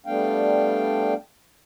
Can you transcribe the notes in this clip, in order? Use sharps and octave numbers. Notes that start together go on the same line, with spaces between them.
G3 A3 B3 D4 F5 G5